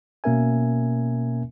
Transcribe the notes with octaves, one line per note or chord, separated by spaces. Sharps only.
B2 A#3 C#4 A#4 E5 G#5